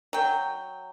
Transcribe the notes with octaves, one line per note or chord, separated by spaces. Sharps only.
F#3 G5